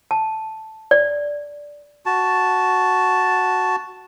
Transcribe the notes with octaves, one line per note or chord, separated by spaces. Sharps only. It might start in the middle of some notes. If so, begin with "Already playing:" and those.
A5
D5
F#4 A5